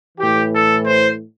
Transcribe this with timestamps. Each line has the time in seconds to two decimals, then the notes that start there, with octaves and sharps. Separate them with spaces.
0.18 A2 E3 G4
0.52 A4
0.84 C5